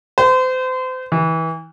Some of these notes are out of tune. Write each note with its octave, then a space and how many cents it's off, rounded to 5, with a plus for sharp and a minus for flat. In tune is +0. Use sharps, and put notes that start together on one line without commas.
C5 -35
E3 -25